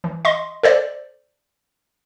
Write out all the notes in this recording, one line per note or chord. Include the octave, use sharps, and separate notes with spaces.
E3
D#5 C6
A4 C5 D5